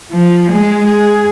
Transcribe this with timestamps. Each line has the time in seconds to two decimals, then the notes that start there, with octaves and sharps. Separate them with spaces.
0.12 F3
0.48 G#3 G#4
0.87 G#4